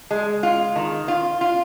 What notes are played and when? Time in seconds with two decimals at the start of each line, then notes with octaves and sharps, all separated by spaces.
0.11 G#3
0.43 F4
0.76 D#3
1.08 F4
1.41 F4